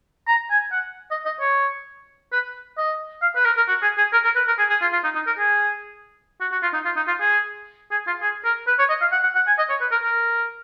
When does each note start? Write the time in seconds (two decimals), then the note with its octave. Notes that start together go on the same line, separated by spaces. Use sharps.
0.28 A#5
0.50 G#5
0.72 F#5
1.11 D#5
1.25 D#5
1.40 C#5
2.32 B4
2.78 D#5
3.22 F5
3.36 B4
3.45 A#4
3.57 A#4
3.68 F#4
3.82 G#4
3.98 G#4
4.13 A#4
4.25 A#4
4.36 B4
4.48 A#4
4.58 G#4
4.70 G#4
4.81 F4
4.92 F4
5.04 D#4
5.15 D#4
5.27 A#4
5.38 G#4
6.41 F#4
6.52 F#4
6.63 F4
6.74 D#4
6.85 F4
6.96 D#4
7.08 F4
7.20 G#4
7.91 G#4
8.07 F4
8.22 G#4
8.45 A#4
8.67 B4
8.79 C#5
8.89 D#5
9.01 F5
9.12 F#5
9.23 F#5
9.35 F#5
9.47 G#5
9.58 D#5
9.70 C#5
9.81 B4
9.91 A#4
10.03 A#4